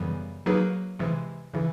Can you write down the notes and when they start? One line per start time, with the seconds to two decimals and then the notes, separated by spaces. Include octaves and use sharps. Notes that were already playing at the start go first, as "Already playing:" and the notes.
Already playing: F#2 C#3 E3 G3 B3
0.46 F#3 A#3 D#4 G#4 B4
0.99 C3 E3 G#3
1.54 C#3 E3